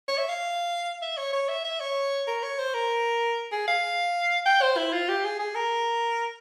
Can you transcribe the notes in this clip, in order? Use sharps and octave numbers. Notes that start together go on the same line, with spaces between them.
C#5
E5
F5
E5
C#5
C#5
E5
E5
C#5
A#4
C#5
C5
A#4
G#4
F5
G5
C5
E4
F4
G4
G#4
G#4
A#4